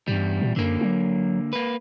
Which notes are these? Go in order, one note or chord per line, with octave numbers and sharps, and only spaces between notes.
E2 G2 G3
A#2
F#2 D3 A#3
F#3
A#3 B4